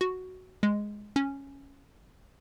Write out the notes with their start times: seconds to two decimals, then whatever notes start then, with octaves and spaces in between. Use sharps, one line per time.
0.01 F#4
0.63 G#3
1.16 C#4